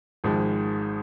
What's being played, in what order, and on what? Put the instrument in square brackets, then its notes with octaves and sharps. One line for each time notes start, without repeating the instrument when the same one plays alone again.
[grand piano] G#1 G#2 F3 G#3